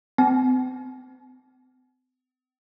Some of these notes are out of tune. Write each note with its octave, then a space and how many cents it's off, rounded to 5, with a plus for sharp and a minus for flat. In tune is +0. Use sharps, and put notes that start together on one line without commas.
C4 -40 G#5 +45